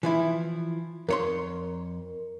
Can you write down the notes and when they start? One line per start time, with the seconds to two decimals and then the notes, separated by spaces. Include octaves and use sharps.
0.03 E3 F3 E4
1.09 F2 A#4 C#5 C6